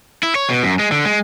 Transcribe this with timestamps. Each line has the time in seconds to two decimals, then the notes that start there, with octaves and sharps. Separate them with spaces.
0.23 E4
0.35 C#5
0.50 B2
0.64 F#2
0.79 G#3
0.92 D3
1.05 G#3